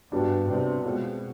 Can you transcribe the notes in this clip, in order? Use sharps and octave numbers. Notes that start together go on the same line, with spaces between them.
G2 G3 B3 D4 F#4
C3 G3 B3 D4 F#4
B2 G#3 C4 F4 A4